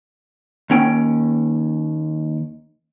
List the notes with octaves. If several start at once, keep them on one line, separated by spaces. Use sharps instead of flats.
D#2 C#4 G5